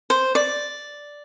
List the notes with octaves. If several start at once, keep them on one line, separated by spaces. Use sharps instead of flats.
C5
D5